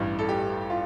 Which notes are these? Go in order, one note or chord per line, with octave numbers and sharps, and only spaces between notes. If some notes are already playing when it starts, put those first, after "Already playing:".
Already playing: A1 G2 E3 G3
A4
G4
F4